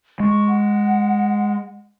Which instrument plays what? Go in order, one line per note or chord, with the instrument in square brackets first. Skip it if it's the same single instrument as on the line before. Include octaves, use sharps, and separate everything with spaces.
[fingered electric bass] G#3 [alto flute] C#6
[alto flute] F#5